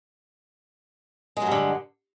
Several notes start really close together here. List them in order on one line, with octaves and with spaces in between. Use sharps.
G#3 F#3 G2 D3